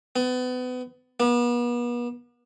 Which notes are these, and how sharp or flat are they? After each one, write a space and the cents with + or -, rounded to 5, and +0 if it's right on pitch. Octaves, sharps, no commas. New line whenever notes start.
B3 +30
B3 -40